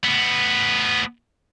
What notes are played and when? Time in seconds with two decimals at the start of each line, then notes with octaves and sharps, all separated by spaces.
0.05 A2 B3